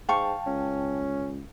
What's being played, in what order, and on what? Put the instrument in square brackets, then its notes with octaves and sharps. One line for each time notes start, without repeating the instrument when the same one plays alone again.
[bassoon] G#2 [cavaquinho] F5 C#6 [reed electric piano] G5 A5
[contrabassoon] C#2 [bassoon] C#4